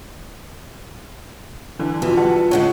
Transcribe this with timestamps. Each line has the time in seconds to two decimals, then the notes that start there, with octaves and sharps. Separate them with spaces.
1.79 D3 E3
2.02 F2 B2 E3 F4
2.17 G3 F#5 A5
2.32 A5
2.51 A2 C#3 G#3 C#5 F#5